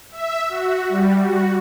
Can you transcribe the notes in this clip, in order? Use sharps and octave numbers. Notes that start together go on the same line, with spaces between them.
E5
F#4
G3
F#4